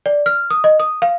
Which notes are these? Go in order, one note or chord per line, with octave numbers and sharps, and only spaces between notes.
D5
F6
D#6
D#5
D#6
F5